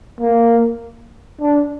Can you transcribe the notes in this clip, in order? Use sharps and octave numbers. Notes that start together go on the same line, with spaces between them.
A#3
D4